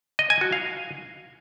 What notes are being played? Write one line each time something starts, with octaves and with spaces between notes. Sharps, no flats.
D#5
G#5
F#4
F5